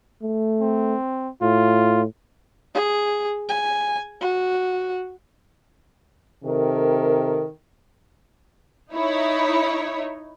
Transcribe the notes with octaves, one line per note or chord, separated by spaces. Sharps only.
A3
C4
A2 F4
G#4
G#5
F#4
C3 D#3 A4 A#4
D#4 E4 C#5